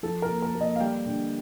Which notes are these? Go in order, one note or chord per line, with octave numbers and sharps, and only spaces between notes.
F3 A4
A#4
A#3
A#4
A#3
D#5
F5
G3 G5
D3